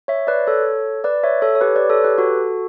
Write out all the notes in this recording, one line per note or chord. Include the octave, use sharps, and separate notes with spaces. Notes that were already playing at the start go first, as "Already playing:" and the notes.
C#5 E5
B4 D5
A4 C#5
B4 D5
C#5 E5
A4 C#5
C#5
G4 B4
B4 D5
A4 C#5
G4 B4
F#4 A4